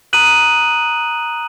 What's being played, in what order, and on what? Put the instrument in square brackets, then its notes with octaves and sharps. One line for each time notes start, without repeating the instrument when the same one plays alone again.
[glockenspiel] A#5 D#6 F#6 D#7 F#7